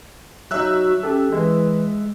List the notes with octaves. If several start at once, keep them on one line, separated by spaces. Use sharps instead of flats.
F#3 D#4 F#4 E5 E6 F#6
C#4 G4 A4
E3 G#3